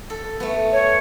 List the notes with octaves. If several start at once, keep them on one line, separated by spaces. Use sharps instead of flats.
A4
A3 B3
C#5